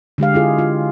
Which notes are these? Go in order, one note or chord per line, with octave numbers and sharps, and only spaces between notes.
D3 G#3 G4 F5
E4 F4 G#4
F4